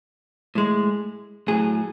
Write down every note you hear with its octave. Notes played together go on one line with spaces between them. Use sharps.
A2 G#3
A2 F#3 G#4